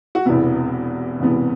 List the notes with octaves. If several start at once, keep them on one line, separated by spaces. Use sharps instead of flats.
F#4
E1 E2 C3 E3 B3 E4
E1 E2 C3 E3 B3